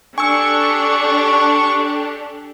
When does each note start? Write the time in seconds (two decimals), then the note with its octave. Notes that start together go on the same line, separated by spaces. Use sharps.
0.18 D4 G4 A4 G#5 C#6 E6